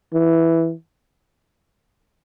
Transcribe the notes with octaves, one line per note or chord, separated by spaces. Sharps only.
E3